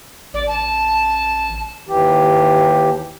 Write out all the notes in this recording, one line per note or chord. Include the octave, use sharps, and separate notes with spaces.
A1 D5
A5
D#2 E3 G4